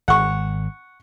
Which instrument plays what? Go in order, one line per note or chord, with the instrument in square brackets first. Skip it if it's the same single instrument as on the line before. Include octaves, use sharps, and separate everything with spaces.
[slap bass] G#1 [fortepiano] F#5 C#6